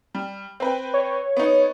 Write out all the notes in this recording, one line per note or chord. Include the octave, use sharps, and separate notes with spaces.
G3
C4 B4 G5
C#5
B3 D#4